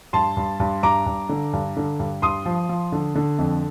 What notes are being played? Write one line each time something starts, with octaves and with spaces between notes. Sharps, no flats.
G2 A5 C6
G2
G2
G2 A#5 D6
G2
D3
G2
D3
G2
G2 C6 D#6
F3
F3
D3
D3
F2